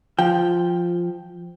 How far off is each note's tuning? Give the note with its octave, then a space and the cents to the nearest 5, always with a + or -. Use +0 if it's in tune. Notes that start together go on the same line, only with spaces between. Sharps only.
F3 +0 G5 +0